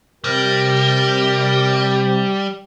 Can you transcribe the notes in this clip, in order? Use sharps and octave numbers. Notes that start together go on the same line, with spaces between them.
C3 G3 G4 A#4